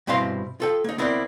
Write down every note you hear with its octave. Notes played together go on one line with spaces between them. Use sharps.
G2 B2 C4 E4 F5 C6
F4 A4 G5
A#3 D#4
B3 C4 E4 A#4 C5 D5